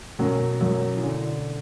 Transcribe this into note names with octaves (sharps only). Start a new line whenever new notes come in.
F#2 B2 F#3 A3 C#4
F#2 F#3
E3
D3